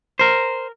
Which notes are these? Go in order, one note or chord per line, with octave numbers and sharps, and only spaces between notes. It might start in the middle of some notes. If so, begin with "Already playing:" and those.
A#4 C5